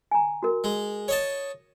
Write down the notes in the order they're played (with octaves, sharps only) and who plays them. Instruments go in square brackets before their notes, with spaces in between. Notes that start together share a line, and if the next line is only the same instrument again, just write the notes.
[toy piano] G#5 A#5
F#4 A#4
[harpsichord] G#3
C#5 D#5 A5